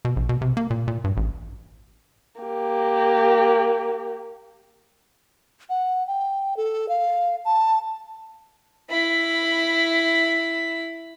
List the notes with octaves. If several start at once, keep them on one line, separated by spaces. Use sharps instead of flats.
B2
A#1
B2
C3
A#3
A#2
A#2
G2
A1
A#3 G4
F#5
G5
A4
F5
A5
E4 B5